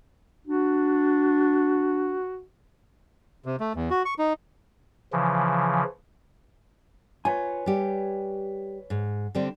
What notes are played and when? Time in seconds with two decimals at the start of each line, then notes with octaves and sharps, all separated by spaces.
0.47 D4 F#4
3.45 C3
3.60 A3
3.76 E2
3.90 F#4
4.05 C#6
4.19 D#4
5.13 C#3 E3 F3
7.25 F4 B4 C#5 G#5
7.66 G3 G4
8.90 G#2
9.35 D3 G3 C4